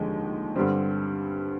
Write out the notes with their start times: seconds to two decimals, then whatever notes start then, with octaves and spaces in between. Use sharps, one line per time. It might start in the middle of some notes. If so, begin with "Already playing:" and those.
Already playing: F1 D#2 D3 F3 G#3
0.56 G2 D3 G3 C4